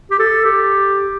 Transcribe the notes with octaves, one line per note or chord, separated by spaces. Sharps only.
G4
A4
G4